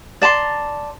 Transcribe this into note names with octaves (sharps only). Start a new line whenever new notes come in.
D5 A5 A#5 C6